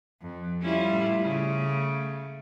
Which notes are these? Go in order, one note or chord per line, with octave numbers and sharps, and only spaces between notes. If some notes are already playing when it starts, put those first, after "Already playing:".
F2
G3 C#4 E4 F4
A2
C#3
A3